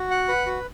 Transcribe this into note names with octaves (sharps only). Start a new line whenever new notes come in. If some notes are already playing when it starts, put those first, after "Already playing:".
Already playing: F#4
F#5
B4
F#4